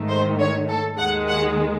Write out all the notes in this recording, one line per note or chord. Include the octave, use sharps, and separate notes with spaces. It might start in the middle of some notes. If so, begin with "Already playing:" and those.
Already playing: G#2 D#3 A3
C5
C#5
A4
D#2 D#3 G#3 F#5
F#5